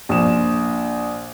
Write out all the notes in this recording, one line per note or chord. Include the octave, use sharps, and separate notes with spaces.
A#1 E7